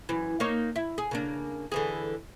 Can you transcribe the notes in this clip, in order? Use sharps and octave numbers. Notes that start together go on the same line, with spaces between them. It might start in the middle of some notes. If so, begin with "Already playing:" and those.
F#2 E3
A#3 D#4 C#5
E4
G#4
C#3 A#3 D4
D3 E3 G#4